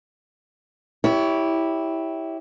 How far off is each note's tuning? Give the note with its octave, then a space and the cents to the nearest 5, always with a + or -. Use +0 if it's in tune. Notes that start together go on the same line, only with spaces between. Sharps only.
E4 -10 G4 +0 C#5 +20